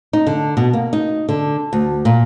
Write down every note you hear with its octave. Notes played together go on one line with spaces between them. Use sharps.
D#4
D3
B2
A#3
D#4
D3
D2
A#2